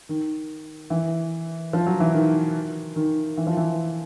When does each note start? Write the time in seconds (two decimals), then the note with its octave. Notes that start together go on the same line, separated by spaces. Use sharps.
0.09 D#3
0.90 E3
1.73 F3
1.86 F#3
2.00 E3
2.14 D#3
2.96 D#3
3.37 E3
3.47 F3
3.57 E3